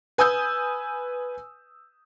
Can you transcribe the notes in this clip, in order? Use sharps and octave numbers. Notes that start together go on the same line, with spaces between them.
B4 G#5 D#6 E6 G6